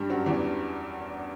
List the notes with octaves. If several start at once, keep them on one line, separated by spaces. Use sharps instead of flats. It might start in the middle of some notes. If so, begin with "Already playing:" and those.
Already playing: G2 G3
F#2 F#3
E2 E3